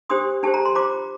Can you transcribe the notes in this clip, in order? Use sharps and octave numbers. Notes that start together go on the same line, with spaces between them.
D4 G4 C5 C6 D#6
D4 G4 C5 A5
A#5
C6
F4 C5 A#5 D6